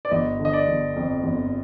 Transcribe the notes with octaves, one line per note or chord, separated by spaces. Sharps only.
D5
G1 D#5
D3
D#5
D5
G1
F2
G1